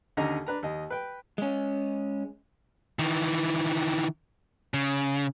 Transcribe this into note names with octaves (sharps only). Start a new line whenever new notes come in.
D#2 D3 C#4 D#4 D#5 A#5
D4 B4 A#5
D#2 D#5
B4 G5
G#3 C#4
D#3 E3
C#3